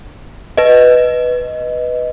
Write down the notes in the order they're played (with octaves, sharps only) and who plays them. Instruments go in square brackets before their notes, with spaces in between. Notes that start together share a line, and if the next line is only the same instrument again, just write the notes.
[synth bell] B4 D#5